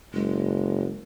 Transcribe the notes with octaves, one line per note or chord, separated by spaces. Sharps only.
F#1 G#3